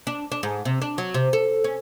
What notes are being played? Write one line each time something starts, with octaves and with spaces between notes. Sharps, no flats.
D4
D4
G#2
C3
D4
F#3
C3
A4
C#4